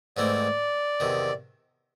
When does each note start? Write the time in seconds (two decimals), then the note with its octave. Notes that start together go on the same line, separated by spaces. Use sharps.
0.17 G#2 E3 A3 C4 D5
1.00 E2 C3 D#3